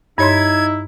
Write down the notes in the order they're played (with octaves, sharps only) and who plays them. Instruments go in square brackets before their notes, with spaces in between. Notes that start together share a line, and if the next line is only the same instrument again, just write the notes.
[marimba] G2 C#5 C6 [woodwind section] D#4 E4 [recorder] G#6